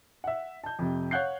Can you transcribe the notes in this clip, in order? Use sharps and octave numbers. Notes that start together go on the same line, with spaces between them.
E5 F#5
A5 G6
F2 C3
C#5 F5 F#5 F#6 G6 C7